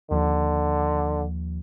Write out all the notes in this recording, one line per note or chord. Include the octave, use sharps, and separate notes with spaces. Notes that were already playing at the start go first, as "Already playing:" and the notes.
D#2 D3 F3